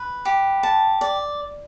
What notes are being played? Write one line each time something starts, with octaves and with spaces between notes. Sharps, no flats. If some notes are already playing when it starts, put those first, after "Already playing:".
Already playing: B4
G4
A5
D5